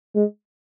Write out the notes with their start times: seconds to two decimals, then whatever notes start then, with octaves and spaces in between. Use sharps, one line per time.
0.15 G#3